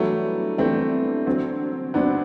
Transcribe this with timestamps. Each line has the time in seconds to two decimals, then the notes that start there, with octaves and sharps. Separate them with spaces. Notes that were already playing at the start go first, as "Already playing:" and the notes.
Already playing: E3 F#3 G3 A3 B3 D4
0.58 E3 G3 A3 B3 C4 D4
1.26 D3 F#3 C4
1.94 D3 F#3 B3 C4 D4